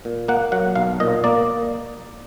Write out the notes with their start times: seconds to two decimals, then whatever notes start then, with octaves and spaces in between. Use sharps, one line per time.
0.05 A#2
0.28 A#3 F#5
0.52 F#3 F#5
0.75 B1 F5
1.00 A#2 D#5
1.24 A#3 D5